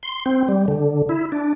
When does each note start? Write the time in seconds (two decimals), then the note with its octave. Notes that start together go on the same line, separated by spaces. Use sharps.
0.03 C6
0.26 C4
0.48 G3
0.68 D3
1.09 E4
1.32 D4